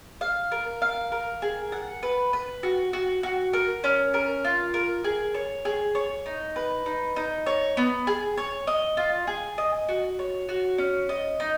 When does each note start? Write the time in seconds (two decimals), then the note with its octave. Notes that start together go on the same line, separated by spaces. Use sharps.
0.21 F5
0.52 A#4
0.82 F5
1.12 A#4
1.42 G#4
1.72 F#5
2.03 B4
2.33 B4
2.63 F#4
2.93 F#4
3.23 F#4
3.53 A#4
3.84 C#4
4.14 A#4
4.45 F4
4.74 A#4
5.04 G#4
5.35 C#5
5.65 G#4
5.95 C#5
6.26 D#4
6.56 B4
6.86 D#4
7.16 D#4
7.46 C#5
7.77 B3
8.07 G#4
8.37 C#5
8.67 D#5
8.97 F4
9.27 G#4
9.58 D#5
9.89 F#4
10.19 C#5
10.49 F#4
10.78 C#4
11.09 D#5
11.40 D#4